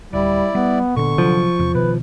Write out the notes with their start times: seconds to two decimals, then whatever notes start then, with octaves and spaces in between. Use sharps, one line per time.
0.13 D1 G3 E4 D5
0.55 G3 B3
0.96 A#2 D3 B3 C#6
1.18 C3 F3 F#3
1.59 E2 C3
1.75 B2 D#3 B4